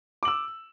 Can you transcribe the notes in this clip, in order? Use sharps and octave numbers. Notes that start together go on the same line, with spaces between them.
D6 E6 F#7